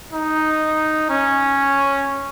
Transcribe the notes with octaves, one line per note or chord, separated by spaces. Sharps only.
D#4
C#4